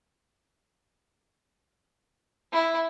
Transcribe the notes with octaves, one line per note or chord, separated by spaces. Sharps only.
E4